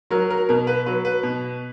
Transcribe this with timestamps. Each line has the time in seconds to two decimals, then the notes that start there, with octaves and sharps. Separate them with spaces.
0.10 F#3 A#4
0.30 A#4
0.49 B2 A#4
0.67 B4
0.86 F#3 B4
1.05 B4
1.23 B2